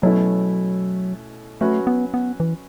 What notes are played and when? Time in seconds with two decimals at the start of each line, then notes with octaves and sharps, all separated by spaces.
0.02 B2 F#3 A3 C#4 E4 A4
1.61 F#3 A3 C#4 F#4 B4
1.87 B3
2.14 B3
2.40 E3